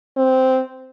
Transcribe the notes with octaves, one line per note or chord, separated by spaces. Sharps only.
C4